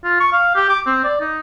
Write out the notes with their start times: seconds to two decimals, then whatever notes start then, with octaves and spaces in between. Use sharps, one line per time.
0.04 F4
0.20 C#6
0.32 F5
0.55 G4
0.69 D6
0.86 C4
1.04 D5
1.21 D#4